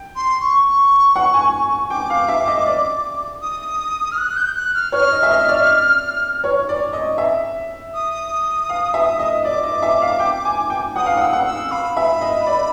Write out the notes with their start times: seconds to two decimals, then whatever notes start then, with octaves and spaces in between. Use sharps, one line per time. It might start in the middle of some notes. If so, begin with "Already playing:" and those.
Already playing: G5
0.16 C6
0.40 C#6
1.16 F#5
1.34 G#5
1.90 G5 D6
2.10 F5
2.28 E5
2.47 D#5
2.66 D5
3.41 D#6
4.11 F6
4.17 F#6
4.36 G6
4.55 F#6
4.74 F6
4.92 C#5 F6
5.12 D#5
5.23 E5
5.31 D#5
5.49 D5
6.44 C#5
6.69 D5
6.93 D#5
7.18 E5
7.94 D#6
8.69 F5
8.94 E5
9.19 D#5
9.44 D5 D6
9.63 D#5
9.83 E5
10.02 F5
10.20 G5
10.45 G#5
10.70 G5
10.96 F#5 D#6
11.06 F5
11.17 F#5
11.21 E6
11.33 F#5
11.46 E6
11.71 F5 B5
11.97 E5
12.21 D#5
12.47 D5